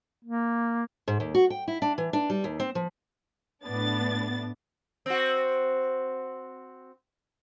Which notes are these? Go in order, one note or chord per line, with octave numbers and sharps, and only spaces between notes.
A#3
G#2
D#2
F#4
G5
E4
D4
E3
D4
G3
D#2
C4
F3
A2 B3 D4 A6
C4 F#4